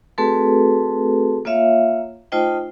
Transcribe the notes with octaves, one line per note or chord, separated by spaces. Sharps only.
A3 C4 F#4 G#4 A4 B4
A#3 F4 C#5 E5 F5
A3 D#4 F4 C5 D#5 G5